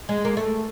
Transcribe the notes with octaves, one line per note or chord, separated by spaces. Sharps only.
G#3
A#3
A3